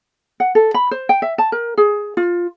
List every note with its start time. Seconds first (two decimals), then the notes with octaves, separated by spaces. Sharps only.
0.40 F#5
0.55 A4
0.74 B5
0.91 C5
1.09 G5
1.22 E5
1.38 A5
1.52 A#4
1.77 G#4
2.17 F4